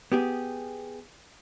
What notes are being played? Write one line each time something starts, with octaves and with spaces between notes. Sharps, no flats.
B3 G4 G#4